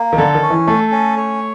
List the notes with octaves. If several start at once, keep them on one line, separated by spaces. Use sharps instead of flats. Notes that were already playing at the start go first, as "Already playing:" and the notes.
Already playing: A#3
D#3
D3 A4
D#3
C#4
E3
A3 A4
C#4
C#5